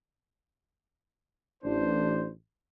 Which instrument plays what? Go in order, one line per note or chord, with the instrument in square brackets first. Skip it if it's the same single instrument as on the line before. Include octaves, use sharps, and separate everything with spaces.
[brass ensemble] A1 D4 C5